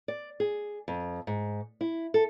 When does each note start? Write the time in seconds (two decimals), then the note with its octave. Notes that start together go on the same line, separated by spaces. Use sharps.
0.08 D5
0.40 G#4
0.88 F2
1.27 G#2
1.81 E4
2.14 A4